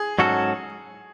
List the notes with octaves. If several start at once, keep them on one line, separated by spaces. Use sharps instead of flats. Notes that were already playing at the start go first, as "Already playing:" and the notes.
Already playing: G#4
G#2 F#3 C#4 F#4 A4